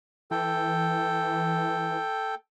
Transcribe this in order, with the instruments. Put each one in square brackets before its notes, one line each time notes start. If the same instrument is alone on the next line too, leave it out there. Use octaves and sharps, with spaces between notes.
[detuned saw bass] E3 [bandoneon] A4 G5